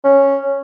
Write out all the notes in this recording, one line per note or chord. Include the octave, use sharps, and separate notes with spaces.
C#4